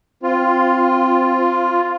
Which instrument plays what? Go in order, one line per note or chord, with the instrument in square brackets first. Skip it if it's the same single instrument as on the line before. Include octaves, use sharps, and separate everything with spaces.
[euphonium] C4 [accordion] F4